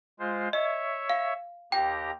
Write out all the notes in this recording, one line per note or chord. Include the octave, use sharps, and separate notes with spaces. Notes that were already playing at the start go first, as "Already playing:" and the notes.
G#3 F4 C5
C#5 D#5 E5
F5
D#2 G4 G5 A#5